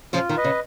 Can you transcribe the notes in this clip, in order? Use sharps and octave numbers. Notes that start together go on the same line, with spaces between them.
C#3 F3 F4
D#3
B4 D#5
C#3